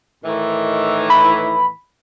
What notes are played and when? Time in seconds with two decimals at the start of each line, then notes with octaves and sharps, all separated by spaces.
0.24 A2 D#3 E3
1.10 B5